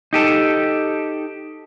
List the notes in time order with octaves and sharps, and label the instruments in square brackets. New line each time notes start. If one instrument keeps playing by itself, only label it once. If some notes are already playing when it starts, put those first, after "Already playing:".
[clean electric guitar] D#4 G4 A4